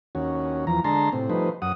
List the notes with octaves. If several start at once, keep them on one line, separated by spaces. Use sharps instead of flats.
D#2 C#4 F#4
E2 F3 A#5
D3 G#3 A5 A#5 C6
A2 C3 C4
F3 G3 A3 D#4 B4 C5
F#2 F#5 D#6